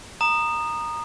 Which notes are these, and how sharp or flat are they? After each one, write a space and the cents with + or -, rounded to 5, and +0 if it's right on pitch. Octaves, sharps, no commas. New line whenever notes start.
A#5 +0 D#6 -20